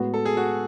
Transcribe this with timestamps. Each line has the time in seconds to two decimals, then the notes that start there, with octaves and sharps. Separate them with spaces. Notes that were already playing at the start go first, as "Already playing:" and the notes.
Already playing: A2 G#3 B3 F#4
0.14 A4
0.25 G#4
0.37 F#4